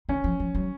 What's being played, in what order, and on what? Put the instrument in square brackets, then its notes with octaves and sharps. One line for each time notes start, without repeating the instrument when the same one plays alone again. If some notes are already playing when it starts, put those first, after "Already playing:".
[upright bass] D#3 [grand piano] C#4
[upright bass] F3
F3
F#3